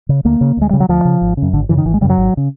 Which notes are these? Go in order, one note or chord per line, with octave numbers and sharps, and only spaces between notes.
C#3
D2 A#3
C#3
D2 G#3
C#3 G3
F#3
D2 F3
C#3
G#1
C#3
F#2
G#1 D3
F#2 C#3 E3
D#3
G#1 E3
G#3
F#2 C#3 G3
F#3
G#1
C#3